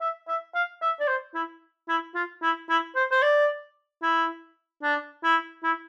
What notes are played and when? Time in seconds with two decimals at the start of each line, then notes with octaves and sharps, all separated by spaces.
0.01 E5
0.28 E5
0.55 F5
0.82 E5
1.00 D5
1.07 C5
1.34 E4
1.88 E4
2.15 F4
2.42 E4
2.69 E4
2.95 C5
3.11 C5
3.22 D5
4.02 E4
4.83 D4
5.23 E4
5.63 E4